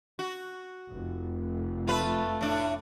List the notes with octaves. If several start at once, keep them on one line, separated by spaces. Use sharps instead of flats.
F#4
F1 F2
A3 F4 B4
A2 D4